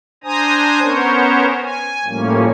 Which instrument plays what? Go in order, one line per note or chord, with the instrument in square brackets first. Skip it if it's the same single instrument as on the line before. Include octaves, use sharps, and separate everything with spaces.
[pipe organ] D4 C5 G#5 A#5 D#6
B3 C#4 A#4 C5 C#5
G#5
A2 F3 G3 A#3 C#4